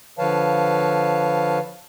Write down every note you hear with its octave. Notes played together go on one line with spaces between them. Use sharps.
D3 F3 B4 C#5 F5 A5